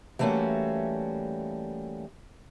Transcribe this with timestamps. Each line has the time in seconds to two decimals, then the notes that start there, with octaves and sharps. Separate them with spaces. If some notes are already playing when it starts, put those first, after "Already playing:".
0.19 E3 G3 A3 A#3 C#4 F#4